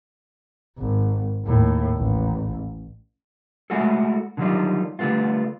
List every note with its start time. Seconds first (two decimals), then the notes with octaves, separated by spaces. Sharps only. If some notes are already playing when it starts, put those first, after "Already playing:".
0.79 G#1
1.46 D#2 A2
1.97 A1
3.70 G#3 A3 E4 F#4 G#4 A4
4.37 D3 D#3 F#3 G3 D#4 F4
4.99 D3 G3 A3 B3 F4